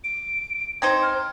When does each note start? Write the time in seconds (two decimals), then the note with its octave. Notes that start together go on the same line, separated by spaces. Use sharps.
0.04 D7
0.82 C4 D#4 C5 G#6
1.03 F6